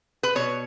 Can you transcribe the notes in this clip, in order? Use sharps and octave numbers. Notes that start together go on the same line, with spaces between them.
B4
B2 C#5